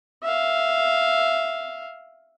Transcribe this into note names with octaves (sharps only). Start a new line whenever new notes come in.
E5 F5